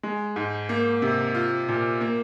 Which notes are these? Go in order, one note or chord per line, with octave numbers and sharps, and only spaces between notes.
G#3
G#2
A#3
C3
F4
A#2
A#3